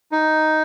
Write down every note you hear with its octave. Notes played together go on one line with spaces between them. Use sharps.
D#4